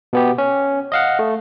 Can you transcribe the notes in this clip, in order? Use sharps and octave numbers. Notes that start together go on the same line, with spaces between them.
B2 B3 G4
C#4
D#5 F5 F#5
A3